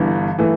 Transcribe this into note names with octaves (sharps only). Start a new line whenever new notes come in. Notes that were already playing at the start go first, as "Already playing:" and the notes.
Already playing: G1 G2 E3
E3 A3